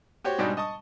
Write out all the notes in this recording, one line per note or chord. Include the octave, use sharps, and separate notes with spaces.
F#4 G4 C5 C#5
G#2 B2 G3 G#3 D4 D#4
D#5 A5 C#6 D#6